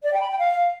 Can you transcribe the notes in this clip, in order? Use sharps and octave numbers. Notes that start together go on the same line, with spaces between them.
D5
G5
B5
G5
F5